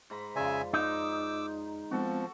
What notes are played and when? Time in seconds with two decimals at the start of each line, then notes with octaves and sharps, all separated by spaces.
0.10 G#2 A#5 B5
0.36 F2 C#3 F4 D5 E5 G#5
0.73 D#4 D6 E6
1.91 F3 G#3 B3 C4 F#4 A4